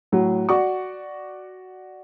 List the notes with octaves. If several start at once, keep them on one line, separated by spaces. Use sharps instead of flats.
A2 F#3
F#4 D5 C#6